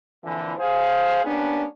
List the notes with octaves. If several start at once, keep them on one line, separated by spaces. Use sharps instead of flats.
F2 A#2 D3 E3
G#4 C5 F5
G3 A#3 B3 C#4 D4